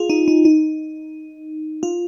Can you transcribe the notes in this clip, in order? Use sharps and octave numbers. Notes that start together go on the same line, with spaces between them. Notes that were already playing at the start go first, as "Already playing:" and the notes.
Already playing: F4 G#4
D#4
D#4
D#4
F4